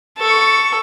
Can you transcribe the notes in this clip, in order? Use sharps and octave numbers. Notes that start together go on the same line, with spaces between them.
A4 C#6